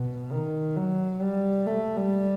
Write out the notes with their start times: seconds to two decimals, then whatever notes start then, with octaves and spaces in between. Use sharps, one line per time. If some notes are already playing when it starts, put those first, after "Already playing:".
Already playing: B2
0.32 D#3
0.77 F#3
1.22 G3
1.66 A3
1.97 G3